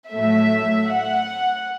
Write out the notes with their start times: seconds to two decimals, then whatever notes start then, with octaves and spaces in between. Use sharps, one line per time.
0.11 A2 F#3 A3 E5
0.91 F#5